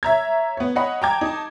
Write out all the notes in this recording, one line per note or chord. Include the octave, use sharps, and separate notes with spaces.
C#5 E5 A#5 G#6
B3 C#5
C#5 D#5 F#5 B5
G5 A5 A#5 D6 G#6
D#4 A5